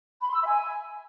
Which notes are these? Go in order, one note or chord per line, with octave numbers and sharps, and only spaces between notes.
B5
C6
E6
E5
G#5